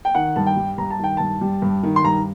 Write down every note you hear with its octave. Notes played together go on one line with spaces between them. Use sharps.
G5
D#3 F#5
G2 A5
G5
G3
G2 A#5
A5
D#3 G5
G2 A5
G3
G2
D#3
C6
G2 A#5